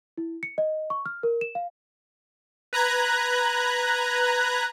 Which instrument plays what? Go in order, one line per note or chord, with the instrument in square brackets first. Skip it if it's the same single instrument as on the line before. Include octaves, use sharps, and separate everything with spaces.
[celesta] E4
C#7
D#5
C#6
F6
A#4
E7
F5
[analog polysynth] B4 A#5 F#6 G#6